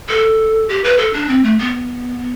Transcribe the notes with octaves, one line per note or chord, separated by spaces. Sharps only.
A4
G4
B4
A4
D4
C4
A3
B3